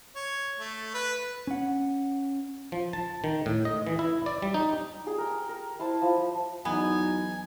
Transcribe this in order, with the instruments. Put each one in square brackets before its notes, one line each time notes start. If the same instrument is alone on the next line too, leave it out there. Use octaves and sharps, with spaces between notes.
[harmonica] C#5
A3
B4
[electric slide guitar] C#4 F#5
[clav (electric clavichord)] F3
A5
D#3
A2
D#5
E3
E4
D5
G3
D#4
[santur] G4 G#4
A#4 G5
A#4
E4 C5 A5
F3
[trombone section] E2 D#4 [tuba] F#3 [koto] B3 [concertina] G#5